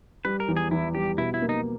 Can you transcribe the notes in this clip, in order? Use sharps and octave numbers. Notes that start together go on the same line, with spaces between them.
G3 B4
A#4
E2
G#4
E2 E4
G3 G4
B2 E4
E4
A#3
D#4